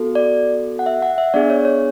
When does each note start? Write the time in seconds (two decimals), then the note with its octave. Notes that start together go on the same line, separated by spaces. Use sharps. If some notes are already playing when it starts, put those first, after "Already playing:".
Already playing: B3 F#4 A4
0.15 D5
0.79 F#5
0.86 E5
1.02 F#5
1.18 E5
1.34 B3 D4 G#4 D5
1.50 C#5
1.65 C#5